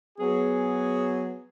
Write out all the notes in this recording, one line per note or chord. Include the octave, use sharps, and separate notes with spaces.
F#3 B3 G#4